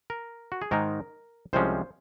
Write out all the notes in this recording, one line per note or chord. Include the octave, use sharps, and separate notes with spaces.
A#4
F#4
G#4
G#2 D#3 G#3 D#4 A#4
C2 C3 F3 G#3 C#4 C5